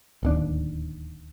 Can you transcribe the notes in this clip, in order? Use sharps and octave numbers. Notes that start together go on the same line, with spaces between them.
D1 D#2 D4